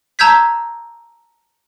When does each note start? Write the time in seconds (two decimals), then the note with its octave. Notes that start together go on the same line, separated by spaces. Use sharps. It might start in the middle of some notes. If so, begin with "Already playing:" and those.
0.19 A5 A#5 E6 G6 G#6 B6